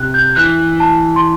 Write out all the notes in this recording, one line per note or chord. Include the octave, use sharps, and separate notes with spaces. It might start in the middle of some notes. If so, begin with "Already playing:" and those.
Already playing: C3 F#6
G6
E3 F#6
A5
C6